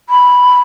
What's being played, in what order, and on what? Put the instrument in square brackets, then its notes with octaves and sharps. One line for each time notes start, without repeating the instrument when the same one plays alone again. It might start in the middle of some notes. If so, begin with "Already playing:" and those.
[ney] B5